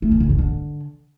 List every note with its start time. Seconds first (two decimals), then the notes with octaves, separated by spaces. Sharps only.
0.02 A3
0.11 D#3
0.20 C#3
0.29 G2
0.38 D3